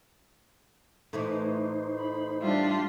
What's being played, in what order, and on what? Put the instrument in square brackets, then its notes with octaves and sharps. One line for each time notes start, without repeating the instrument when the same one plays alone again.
[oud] A2 E3 A3 [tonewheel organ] D#4 C5
[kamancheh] B5
[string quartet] G3 F4 [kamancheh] D4 E5